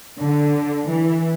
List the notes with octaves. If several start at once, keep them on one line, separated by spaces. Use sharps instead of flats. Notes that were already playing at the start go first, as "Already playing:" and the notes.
D3
E3